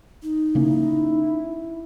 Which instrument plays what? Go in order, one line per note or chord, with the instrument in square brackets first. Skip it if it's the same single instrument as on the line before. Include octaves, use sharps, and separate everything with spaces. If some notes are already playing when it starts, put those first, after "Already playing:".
[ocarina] D#4
[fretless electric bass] C#3 A#3 C#4 [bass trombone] E4